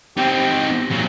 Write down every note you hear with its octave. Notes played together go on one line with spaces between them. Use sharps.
C4 D#4 G4
A#2 F#3